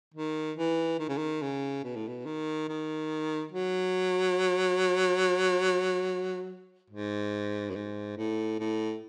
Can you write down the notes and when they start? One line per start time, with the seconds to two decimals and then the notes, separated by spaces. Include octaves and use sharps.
0.14 D#3
0.57 E3
0.99 D#3
1.09 C#3
1.17 D#3
1.42 C#3
1.84 B2
1.96 A2
2.08 B2
2.26 D#3
2.69 D#3
3.52 F#3
6.90 G#2
7.70 F#2
7.75 G#2
8.17 A2
8.59 A2